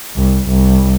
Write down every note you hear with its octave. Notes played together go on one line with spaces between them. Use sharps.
C2
C2